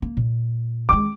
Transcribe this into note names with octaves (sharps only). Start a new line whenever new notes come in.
A#3
A#2
D#3 G#3 D6